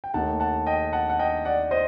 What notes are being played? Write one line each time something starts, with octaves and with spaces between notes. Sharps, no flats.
G5
D#2 D#3 A3 F#5 A5
F#5 A5
D#5 G5
F#5 A5
F#5
D#5 G5
D5 F#5
C5 D#5